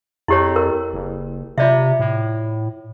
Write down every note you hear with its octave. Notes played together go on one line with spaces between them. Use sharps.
F2 E4 G4 C#5
A#4
F#1
C3 F4 D5 E5
A2